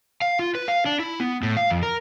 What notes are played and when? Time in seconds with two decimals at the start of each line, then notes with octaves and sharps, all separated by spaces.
0.22 F5
0.39 F4
0.55 B4
0.68 F5
0.86 D4
1.00 E4
1.20 B3
1.43 A2
1.57 F5
1.70 F2
1.83 A#4